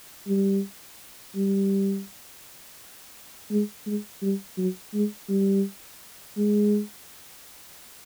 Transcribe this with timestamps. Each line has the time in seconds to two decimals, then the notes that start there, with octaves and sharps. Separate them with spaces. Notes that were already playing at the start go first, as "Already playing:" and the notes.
0.27 G3
1.35 G3
3.51 G#3
3.86 G#3
4.22 G3
4.58 F#3
4.94 G#3
5.29 G3
6.37 G#3